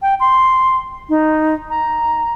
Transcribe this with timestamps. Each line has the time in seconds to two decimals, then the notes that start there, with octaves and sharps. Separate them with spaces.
0.02 G5
0.20 C6
1.09 D#4
1.69 A#5